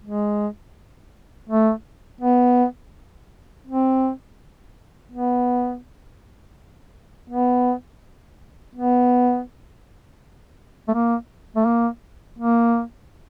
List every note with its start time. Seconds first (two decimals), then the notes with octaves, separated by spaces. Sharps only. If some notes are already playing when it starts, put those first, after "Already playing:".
0.03 G#3
1.49 A3
2.21 B3
3.67 C4
5.12 B3
7.30 B3
8.76 B3
10.88 A3
10.94 A#3
11.56 A3
11.66 A#3
12.39 A#3